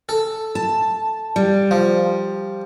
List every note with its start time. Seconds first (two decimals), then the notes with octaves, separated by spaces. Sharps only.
0.09 A4
0.55 A5
1.36 G3
1.71 F3